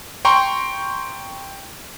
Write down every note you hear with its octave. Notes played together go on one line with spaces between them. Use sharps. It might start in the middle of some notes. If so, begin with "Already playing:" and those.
G5 A#5 C6 C#6